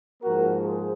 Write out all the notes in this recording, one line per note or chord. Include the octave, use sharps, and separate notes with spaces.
G#2 F3 A#3 F#4 A#4
G#4 C5